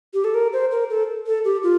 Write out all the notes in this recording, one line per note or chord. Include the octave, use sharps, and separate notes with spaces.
G4
A4
A#4
C5
A#4
A4
A4
G4
F4